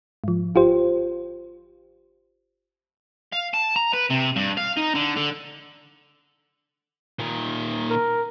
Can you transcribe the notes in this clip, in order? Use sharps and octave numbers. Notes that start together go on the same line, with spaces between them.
G#2 F3
G1 F4 G4 C5
F5
A5
A#5
B4
C3
G2
F5
D#4
D3
D3
A#2 D#3
A#4